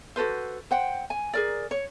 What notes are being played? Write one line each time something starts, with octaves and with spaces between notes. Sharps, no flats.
F#4 A4 B4 C5
C5 F#5 G5
G#5
G#4 A#4 D5
C#5